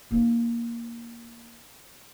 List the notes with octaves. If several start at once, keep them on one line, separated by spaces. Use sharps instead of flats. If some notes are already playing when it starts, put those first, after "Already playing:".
A#3 D#4